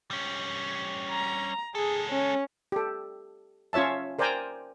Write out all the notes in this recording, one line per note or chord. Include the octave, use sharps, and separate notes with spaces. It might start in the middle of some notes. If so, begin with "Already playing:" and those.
G3 C#4
A#5
G#3 G#4 A4
C#4
G4 A4
C#4 F4 C#5 E5 A5
A#4 C5 D5 G5 G#5 A#5